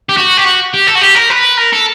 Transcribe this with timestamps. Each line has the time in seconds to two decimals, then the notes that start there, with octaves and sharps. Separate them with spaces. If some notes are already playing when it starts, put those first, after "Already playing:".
0.09 G4
0.17 F#4
0.37 G4
0.45 F#4
0.74 G4
0.87 A4
0.95 F#4
1.01 G4
1.15 A#4
1.30 B4
1.57 A#4
1.73 A4